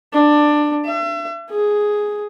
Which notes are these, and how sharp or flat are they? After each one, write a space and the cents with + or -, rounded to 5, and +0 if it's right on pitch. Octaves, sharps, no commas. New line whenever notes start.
D4 +15
E5 +40
G#4 +5